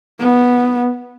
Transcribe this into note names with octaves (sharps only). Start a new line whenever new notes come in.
B3